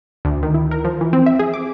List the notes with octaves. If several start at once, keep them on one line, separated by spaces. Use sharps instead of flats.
D2
D#3
E4
A#4
F3
E3
C4
E5
G#4
D6